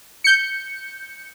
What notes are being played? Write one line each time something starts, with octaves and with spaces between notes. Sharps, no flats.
G6 C#7